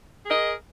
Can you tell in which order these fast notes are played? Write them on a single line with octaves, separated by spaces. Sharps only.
G#4 A#4 D#5